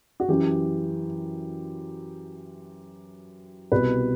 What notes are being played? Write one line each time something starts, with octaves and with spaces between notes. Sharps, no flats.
F#4
F#2 E3 G4
C2 B2 B4